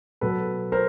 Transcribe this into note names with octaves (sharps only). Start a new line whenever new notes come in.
B2 F#3 A4 B4
A#4 C5